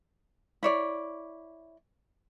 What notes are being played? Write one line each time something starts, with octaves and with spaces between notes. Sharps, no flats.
E4 C#5 D5